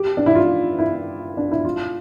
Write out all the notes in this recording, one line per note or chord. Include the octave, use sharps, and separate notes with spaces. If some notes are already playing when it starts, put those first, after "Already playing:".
Already playing: G4
D4
E4
F4
E4
D4
E4
F4